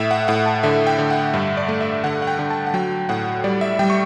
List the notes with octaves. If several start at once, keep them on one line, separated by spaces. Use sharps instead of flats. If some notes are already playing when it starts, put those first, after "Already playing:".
Already playing: A2 E5
F#5
A2 F#5
A5
D3 E5
G5
D3
F#5
G2 E5
D5
A3
E5
D3 F#5
F#5
G5
D3
A5
F#5
F#3 G5
A2 F#5
G3 D5
E5
G3 G5
C#6